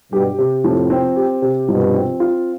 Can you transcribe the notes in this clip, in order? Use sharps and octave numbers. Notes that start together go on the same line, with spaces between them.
G2 B2 G4
C3
F2 A2 F3
C4
G4
C3
G2 B2 F3
C4
F4